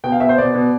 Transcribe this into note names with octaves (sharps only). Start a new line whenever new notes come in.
B2 G5
F5
B2 E5
C5
B2 D5
B2